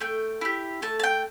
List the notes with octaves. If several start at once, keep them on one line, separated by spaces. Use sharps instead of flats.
A3 G5
E4 G4
A3 A5
A5
G5